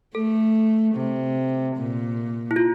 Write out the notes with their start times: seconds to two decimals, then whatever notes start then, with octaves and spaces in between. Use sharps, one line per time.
0.15 A3 A4
0.95 C3
1.76 A#2
2.51 E4
2.56 F4